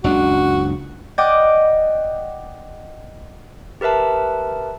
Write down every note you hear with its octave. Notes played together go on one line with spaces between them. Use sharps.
F#1 C#2 D4 F#4
D5 D#5 F#5 G5 D6
G4 A#4 B4 E5 A5